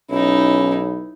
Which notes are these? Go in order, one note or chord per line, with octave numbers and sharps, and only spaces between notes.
B1 C#4 D#4 E4